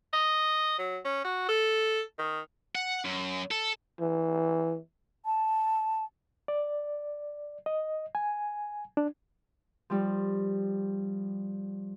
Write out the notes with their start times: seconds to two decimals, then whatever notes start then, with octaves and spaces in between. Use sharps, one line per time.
0.13 D#5
0.79 F#3
1.05 C#4
1.25 F#4
1.49 A4
2.19 D#3
2.75 F#5
3.05 F#2
3.51 A4
4.00 E3
5.25 A5
6.48 D5
7.66 D#5
8.15 G#5
8.97 D4
9.90 F3 G3